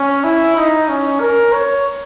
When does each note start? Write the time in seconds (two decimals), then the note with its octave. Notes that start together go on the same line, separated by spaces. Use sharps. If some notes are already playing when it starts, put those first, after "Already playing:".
Already playing: C#4
0.24 E4
0.57 D#4
0.89 C#4
1.21 A#4
1.52 C#5